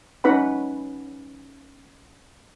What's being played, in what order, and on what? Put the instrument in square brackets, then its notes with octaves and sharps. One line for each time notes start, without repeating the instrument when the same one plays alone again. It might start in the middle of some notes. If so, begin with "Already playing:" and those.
[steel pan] C#4 D#4 B4 F#5 B5